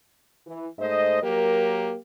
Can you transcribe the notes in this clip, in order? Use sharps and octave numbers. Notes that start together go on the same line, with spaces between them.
E3
G#2 A3 C5 D#5
F#3 A#3 G4 A#4